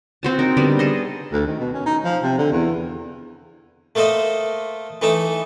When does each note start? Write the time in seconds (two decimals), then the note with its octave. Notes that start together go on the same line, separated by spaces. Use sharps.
0.23 C4 F#4 A5
0.39 D#4 A#4
0.57 D3 G3 B3 D5
0.79 G#4 A4 D#5
1.32 D2
1.47 D#3
1.59 B2
1.74 C#4
1.86 D#4
2.04 F3
2.22 C3
2.38 D3
2.52 E2
3.95 A3 A#3 A4 C5 D#5
5.02 E3 A3 D#4 A4 A5